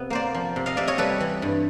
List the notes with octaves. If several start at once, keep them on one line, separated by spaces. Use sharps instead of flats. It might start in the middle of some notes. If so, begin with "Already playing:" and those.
Already playing: C3 B3
A#3 C5 D5
F3
C3
D#5 F5
C3 D5 E5
C#5 D#5
G3 A4 B4
E3
G2